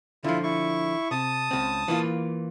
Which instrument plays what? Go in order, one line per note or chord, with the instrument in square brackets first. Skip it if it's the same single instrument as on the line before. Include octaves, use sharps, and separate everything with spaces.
[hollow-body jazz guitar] D3 F3 [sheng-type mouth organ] E4 F4
[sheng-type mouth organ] E4 C#6
[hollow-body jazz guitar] C3 [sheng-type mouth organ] A5 D#6
[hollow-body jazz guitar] C#2 C4
E3 A#3 F4